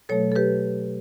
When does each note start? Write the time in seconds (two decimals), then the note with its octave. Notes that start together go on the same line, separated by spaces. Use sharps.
0.09 B2 F#3 A3 A4 C#5
0.32 A4
0.36 G4 B4